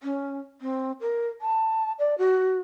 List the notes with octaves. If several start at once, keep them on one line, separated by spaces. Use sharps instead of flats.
C#4
C4
A#4
A5
D5
F#4